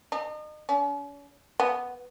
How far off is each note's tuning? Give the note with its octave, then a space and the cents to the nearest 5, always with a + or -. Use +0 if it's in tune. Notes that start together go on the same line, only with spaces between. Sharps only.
D#4 -35
C#4 +45
B3 +0